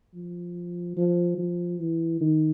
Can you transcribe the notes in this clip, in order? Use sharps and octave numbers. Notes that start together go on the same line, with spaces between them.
F3
F3
F3
E3
D#3